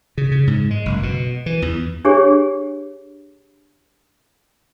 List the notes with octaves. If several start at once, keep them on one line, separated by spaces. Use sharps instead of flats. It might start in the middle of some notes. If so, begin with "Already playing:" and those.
C#3
C#3
G#2
G#3
F#1
B2
E3
E2
D4 G4 G#4 C#5